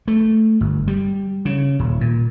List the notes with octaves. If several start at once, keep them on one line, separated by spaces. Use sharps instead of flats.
A3
G1
G3
C#3
D#1
A#2